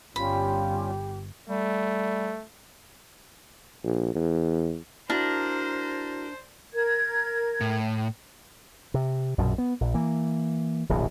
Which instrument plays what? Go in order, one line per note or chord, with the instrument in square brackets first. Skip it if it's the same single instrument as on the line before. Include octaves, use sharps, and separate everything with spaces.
[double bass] G1 [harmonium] G3 C#4 F4 [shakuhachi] G4 [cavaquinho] B5
[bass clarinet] G3 [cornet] A3
[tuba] A#1
E2
[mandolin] D4 [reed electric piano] E4 F#4 [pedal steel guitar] A#4 [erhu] C5
[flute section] A#4 G#6
[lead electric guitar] A2
[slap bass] C3
A#1 F#2 B2
B3
A#1
E3 A#3
D1 A#1 B2